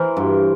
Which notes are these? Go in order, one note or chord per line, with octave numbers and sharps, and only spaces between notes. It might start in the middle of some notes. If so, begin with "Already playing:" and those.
Already playing: E3 A#4 C5
G2